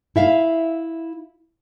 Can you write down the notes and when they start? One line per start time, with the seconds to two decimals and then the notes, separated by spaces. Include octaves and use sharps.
0.16 E4 E5 F5